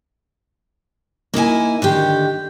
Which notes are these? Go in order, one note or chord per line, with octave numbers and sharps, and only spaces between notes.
A#3 D#4 E4 G#5
D3 D#3 G4